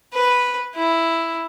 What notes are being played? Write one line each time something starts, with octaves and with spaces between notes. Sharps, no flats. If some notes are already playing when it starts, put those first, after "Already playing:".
B4
E4